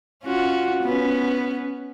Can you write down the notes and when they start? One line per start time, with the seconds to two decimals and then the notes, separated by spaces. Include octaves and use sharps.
0.24 C#4 F4 F#4
0.83 B3 C#4